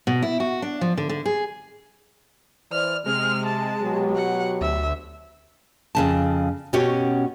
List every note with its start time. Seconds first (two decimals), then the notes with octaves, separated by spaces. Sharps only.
0.07 B2
0.22 E4
0.40 F#4
0.62 D4
0.81 F3
0.98 D3
1.09 D3
1.26 G#4
2.72 E3 C5 D5 F6
3.06 C3 G#3 F6
3.46 A5
3.81 B2 F#3 G4
4.15 F#5
4.61 D2 E5
5.95 F2 C#3 A5
6.73 B2 C#4 F#4 G4 C#5